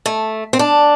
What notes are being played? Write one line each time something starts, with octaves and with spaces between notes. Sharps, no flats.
A3
C4
D4